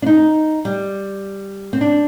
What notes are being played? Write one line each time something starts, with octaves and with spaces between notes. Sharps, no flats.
D4
D#4
G3
C4
D4